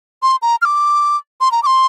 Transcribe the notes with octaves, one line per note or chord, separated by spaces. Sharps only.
C6
A#5
F6
D6
C6
A#5
D6
C6